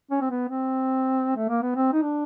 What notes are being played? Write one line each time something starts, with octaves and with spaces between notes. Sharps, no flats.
C#4
C4
B3
C4
A3
A#3
B3
C4
D#4
D4